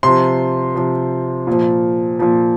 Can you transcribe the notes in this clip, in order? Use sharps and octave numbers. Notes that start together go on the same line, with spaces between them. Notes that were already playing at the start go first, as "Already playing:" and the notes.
C3 F3 C6
C3 F3
A#2 F3
A#2 F3